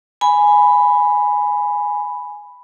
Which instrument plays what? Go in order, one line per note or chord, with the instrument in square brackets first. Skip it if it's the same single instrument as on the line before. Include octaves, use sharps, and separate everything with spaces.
[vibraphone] G#5 B5